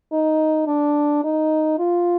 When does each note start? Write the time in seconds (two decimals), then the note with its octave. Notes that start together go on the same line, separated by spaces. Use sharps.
0.12 D#4
0.67 D4
1.24 D#4
1.79 F4